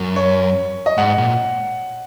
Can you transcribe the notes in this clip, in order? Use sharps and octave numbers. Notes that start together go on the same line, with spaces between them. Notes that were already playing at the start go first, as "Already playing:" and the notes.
Already playing: F#2
C#5
D#5
G#2 F#5
A#2